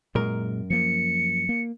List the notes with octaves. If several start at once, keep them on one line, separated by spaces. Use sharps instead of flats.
F#2 A#2 G#3 A#4
F3 A#3 C#7
A#3